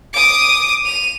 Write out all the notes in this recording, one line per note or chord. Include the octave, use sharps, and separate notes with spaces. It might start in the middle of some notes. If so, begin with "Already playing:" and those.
D6 D#6
D#7 F7